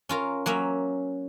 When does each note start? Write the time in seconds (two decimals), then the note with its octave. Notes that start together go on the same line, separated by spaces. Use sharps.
0.09 C#4 F4 A#4
0.46 F#3 A#3 C#4 E5